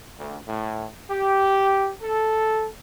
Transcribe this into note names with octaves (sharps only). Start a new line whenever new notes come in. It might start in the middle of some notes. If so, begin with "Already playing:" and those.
D2
A2
G4
A4